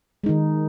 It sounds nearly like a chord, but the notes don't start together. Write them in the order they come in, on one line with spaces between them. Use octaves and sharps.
G#3 D#4 D#3